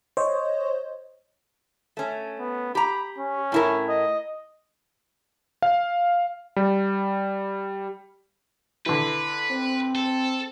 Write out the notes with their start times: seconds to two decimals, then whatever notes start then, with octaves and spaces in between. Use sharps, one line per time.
0.17 C5 C#5 D#5
1.97 A3 C#4
2.40 B3
2.75 G4 A#5 B5
3.19 C#4
3.52 A2 E4 A#4
3.89 D#5
5.62 F5
6.56 G3
8.86 D3 E3 B4
9.52 C4
9.95 A4